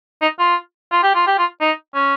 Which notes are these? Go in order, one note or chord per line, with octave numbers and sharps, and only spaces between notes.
D#4
F4
F4
G4
F4
G4
F4
D#4
C#4